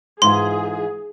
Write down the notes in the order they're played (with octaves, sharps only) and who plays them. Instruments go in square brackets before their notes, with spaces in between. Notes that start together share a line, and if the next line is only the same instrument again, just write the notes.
[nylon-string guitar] G#2 E3 F4 [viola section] G#4 [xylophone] C6